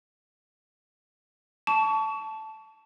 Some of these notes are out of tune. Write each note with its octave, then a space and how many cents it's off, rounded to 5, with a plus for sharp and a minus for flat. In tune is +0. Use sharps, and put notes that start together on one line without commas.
A5 -5 C#6 +30